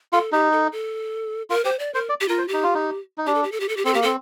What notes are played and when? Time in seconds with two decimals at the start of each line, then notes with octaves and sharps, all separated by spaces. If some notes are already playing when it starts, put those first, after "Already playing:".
0.13 F4 A4
0.32 D#4 G4
0.52 A4
0.72 A4
1.50 F4 A#4
1.65 G4 C5
1.79 D5
1.94 A#4 C5
2.09 D5
2.21 G4
2.28 F4 A#4
2.38 C5
2.48 D#4 G4
2.63 F4
2.75 D#4
3.18 D#4
3.26 D4 G4
3.35 A4
3.43 G4
3.52 A4
3.60 G4
3.69 A4
3.77 G4
3.85 C4 A4
3.94 A#3 G4
4.02 C4 A4